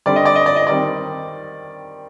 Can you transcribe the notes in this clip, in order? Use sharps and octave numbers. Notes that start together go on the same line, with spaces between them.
D3 G3 C4 D5
D#5
D5
D#5
D5
D#5
D#3 G3 C4 D5